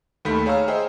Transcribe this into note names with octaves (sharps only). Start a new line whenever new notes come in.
D#2 D#3 A3 B5 G6 B6
G#4 C#5 F5 A#5 E6 F6
G#4 C5 D#5 E5 G5